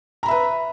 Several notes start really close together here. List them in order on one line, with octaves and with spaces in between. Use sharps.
A#5 B5 E5 B4